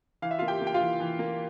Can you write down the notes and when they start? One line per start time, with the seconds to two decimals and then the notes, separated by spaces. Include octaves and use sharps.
0.22 E3 F5
0.31 E5
0.38 F4 F5
0.42 A#3
0.48 G4 G5
0.61 A#3
0.67 G5
0.74 F4 F5
0.81 E3
1.00 E3
1.19 A#3